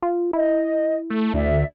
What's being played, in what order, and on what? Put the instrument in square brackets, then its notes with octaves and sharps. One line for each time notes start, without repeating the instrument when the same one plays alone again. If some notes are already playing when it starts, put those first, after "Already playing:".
[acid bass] F4
[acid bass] E4 [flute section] D#5
[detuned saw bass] A3
[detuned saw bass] D2 [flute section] D5 E5